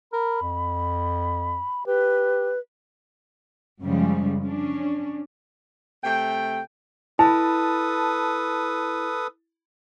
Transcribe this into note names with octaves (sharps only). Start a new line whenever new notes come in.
A#4 B5
F2
G4 B4
F#2 C#3 F3 G3 G#3
C#4 D4
C3 A3 G5
E4 A4 B4 A5 D#6